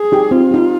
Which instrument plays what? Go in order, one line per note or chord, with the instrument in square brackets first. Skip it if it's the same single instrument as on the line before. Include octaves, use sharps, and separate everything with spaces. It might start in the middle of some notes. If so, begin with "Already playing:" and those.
Already playing: [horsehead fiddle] G#4
[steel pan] D#4 G4
[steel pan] C4 [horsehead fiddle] F4
[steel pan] D#4 G4